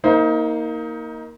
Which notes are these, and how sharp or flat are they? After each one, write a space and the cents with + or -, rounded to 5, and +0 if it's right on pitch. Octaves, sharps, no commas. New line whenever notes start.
A#3 +0 D#4 +30 C5 +0